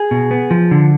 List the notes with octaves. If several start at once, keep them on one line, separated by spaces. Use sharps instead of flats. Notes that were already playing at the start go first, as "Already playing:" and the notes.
Already playing: G#4
B2
B3
F3
D3